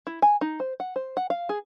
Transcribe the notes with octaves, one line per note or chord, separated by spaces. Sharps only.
E4
G#5
D#4
C5
F#5
C5
F#5
F5
G#4